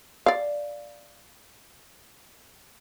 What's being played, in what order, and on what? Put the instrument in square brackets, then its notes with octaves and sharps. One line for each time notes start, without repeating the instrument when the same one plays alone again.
[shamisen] D5 F5